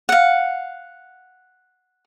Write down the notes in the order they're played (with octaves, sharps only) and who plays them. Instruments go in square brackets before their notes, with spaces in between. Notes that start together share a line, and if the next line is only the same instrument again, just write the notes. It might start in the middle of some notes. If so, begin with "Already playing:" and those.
[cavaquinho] F5 F#5